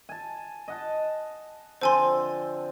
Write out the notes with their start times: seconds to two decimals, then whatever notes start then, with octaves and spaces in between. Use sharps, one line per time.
0.09 G#5 A5
0.68 D#5 F#5 A5
1.81 D3 F3 C4 C5 G#5 C6